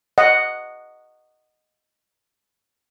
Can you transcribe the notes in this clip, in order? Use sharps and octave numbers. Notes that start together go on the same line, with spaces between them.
D#5 F#5